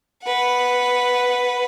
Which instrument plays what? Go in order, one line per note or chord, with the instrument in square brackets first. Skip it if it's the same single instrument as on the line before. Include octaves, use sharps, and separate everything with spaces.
[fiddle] B4 F#5